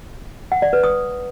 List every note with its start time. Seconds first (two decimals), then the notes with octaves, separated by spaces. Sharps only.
0.52 F#5
0.62 D5
0.73 B4
0.83 D#6